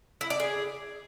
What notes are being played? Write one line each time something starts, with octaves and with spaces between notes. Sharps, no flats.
E4
D5
G#4